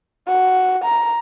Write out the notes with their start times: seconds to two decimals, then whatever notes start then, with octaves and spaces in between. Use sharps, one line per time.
0.28 F#4
0.84 A#5